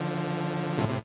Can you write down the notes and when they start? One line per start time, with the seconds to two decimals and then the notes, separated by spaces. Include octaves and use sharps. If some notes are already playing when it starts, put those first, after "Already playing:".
Already playing: D3 F3
0.78 A2 C3
0.88 C3